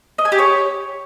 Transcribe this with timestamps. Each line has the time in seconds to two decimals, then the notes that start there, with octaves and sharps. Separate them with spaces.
0.18 D#5
0.25 G#5
0.32 G4
0.38 C#5